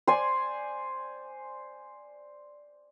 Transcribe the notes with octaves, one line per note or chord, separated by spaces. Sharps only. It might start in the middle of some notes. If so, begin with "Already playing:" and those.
C5 D5 G#5